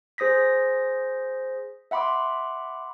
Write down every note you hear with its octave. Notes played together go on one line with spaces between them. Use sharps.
G#4 C5 D#6 A#6 B6
E5 F#5 B5 C6 D6